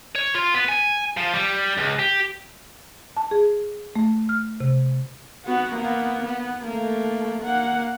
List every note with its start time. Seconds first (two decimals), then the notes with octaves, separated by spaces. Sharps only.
0.15 C#5
0.35 F4
0.54 B3
0.69 G#5
1.17 F3
1.34 G3
1.78 C#2
1.99 G4
3.17 A5
3.31 G#4
3.95 A3
4.29 F6
4.60 C3
5.46 B3 F#4
5.75 A#3 B3
6.23 B3
6.65 A3 A#3
7.42 A#3 F#5